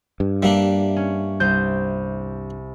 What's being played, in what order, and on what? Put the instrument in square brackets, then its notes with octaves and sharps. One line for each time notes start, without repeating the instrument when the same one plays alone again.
[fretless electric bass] G2
[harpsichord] G3 A#3 D4 [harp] E5
[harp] C#4
C2 C5 G6